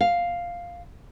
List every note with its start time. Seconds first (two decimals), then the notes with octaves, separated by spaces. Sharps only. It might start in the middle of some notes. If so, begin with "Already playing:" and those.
0.01 F5